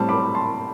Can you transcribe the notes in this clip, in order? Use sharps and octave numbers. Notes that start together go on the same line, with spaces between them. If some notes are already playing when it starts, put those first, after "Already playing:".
Already playing: A2 G3 C4 A5
B5 D6
A5 C6